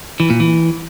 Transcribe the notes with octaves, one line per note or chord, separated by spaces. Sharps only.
E3
A#2
E3